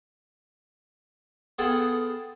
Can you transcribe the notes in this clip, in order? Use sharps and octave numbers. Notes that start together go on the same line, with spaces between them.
B3 F4 G#4 A4 F#5 G5